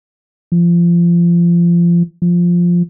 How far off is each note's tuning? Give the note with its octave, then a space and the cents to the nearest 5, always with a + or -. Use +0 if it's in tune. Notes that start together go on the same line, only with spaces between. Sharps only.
F3 -25
F3 +0